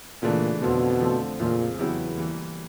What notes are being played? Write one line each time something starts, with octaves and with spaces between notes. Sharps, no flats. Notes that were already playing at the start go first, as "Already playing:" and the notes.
A#2 C#3 E3 A3 D4
F2 B2 D3 F3
D3 F3 A3 C4
F2 A#2 C#3 F3 G#3
E2 C#3 F#3 B3 E4 G4
E3 G3 A#3